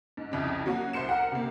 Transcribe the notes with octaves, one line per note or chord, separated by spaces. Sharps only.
G#2
C2 F2 C#3
F#3 A#3 C#4 F#4
C2 C5 C6 C#7 E7
A#4 F#5
C3 A#3